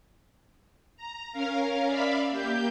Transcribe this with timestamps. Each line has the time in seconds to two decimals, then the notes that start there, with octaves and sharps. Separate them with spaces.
0.97 A#5
1.32 C#4 A#4 F5
1.86 D5 E5 F5 B5
2.30 A#3 G4 G6